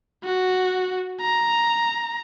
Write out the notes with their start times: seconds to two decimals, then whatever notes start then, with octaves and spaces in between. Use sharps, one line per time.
0.24 F#4
1.21 A#5